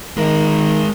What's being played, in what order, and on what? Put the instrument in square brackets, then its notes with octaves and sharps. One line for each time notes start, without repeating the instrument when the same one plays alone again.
[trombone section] D#3 [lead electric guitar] G#3 A#4